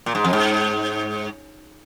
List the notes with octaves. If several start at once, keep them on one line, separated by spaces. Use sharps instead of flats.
A#2
G#2
F2
G#2